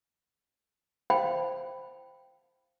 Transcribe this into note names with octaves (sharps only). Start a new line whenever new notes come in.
C5 F5 G5 A5 B5